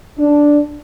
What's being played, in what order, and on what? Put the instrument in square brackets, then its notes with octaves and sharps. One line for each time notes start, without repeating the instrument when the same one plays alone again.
[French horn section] D4